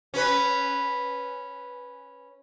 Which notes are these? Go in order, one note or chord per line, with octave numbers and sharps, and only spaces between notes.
C#4 B4